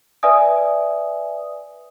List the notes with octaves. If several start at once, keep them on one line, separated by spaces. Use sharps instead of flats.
B4 D5 E5 G#5 D#6